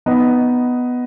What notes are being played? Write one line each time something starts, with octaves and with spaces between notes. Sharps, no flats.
B3 D#4